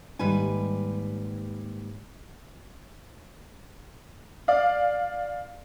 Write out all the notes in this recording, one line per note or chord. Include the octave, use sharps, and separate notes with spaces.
D#2 G#2 G3 B4 G#5
D5 F5